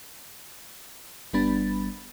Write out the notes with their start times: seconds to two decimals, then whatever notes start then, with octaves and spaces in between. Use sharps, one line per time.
1.33 G1 G3 B3 D4 B5 A6